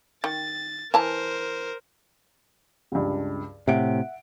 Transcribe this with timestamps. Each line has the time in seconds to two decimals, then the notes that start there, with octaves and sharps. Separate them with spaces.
0.24 D#3 A6
0.94 E3 A#4 C5 A5 A#5
2.92 C#2 G2
3.68 A2 C3 E5 F#5 D7